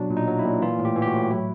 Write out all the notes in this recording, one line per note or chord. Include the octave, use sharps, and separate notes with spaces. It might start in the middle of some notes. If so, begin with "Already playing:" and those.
Already playing: B2 F#3 D4
A#2
D#4
F#3
E4
A#2
E3 F4
A2
G4
E3
G4
F#4
A2
F#3 E4